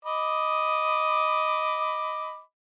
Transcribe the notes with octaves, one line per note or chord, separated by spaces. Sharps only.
D#5 B5 D6